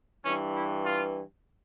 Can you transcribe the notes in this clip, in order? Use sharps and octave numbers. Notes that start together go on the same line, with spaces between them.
G2 E3 C#4
E4
F4